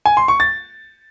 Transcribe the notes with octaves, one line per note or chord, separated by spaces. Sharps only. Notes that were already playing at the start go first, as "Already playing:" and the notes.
G#5
C6
C#6
A6